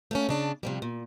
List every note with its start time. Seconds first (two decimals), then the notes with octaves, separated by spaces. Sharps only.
0.11 A3 A#3 C#4
0.29 C#3 D4 A5
0.63 C3 F3 G3
0.82 A#2